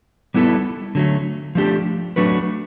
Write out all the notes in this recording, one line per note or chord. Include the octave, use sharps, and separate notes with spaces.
G3 B3 E4 A4
D3 F#3 A3
F3 A3 D4 G4
F#3 A3 D4 F#4 B4